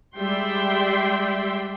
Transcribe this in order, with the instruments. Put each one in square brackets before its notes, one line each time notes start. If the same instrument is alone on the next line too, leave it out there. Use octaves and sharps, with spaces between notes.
[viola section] G3 G#3 D5 E5 G5 C6